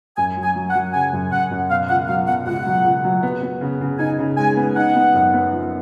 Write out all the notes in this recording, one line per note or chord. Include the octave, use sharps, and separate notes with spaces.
F#2 G#5
F#3
G#5
F#3
F#5
F#3
C#3 G#5
F#2
F#2 F#5
F#2
B2 F5
C#2 F#5
F#3 F5
B2 F#5
C#2 F#5
F#3
C#2
F#3
B3
B3
C#3
C#3
D#4 G#5
C#3
G#3 G#5
B3
D#4 F#5
B3
F#2
B3
F3